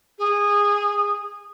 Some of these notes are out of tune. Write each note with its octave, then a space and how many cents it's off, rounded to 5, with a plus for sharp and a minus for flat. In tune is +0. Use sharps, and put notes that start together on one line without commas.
G#4 -20